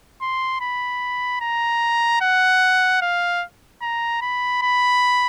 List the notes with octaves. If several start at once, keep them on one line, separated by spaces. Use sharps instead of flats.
C6
B5
A#5
F#5
F5
A#5
B5
B5